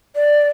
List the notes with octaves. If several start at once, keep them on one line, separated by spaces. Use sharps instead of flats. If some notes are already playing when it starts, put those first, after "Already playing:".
D5